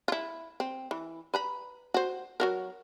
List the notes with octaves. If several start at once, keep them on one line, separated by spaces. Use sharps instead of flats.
E4 F4
C4
E3
B4 A#5 B5
F#4 C5
F#3 F#4 A#4